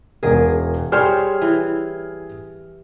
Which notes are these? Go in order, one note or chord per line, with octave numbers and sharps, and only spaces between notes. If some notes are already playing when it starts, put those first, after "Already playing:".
E1 G#4 A#4
G3 G#4 C5 C#5 F6
E3